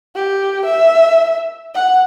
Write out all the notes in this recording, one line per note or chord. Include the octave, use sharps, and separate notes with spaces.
G4
E5
F#5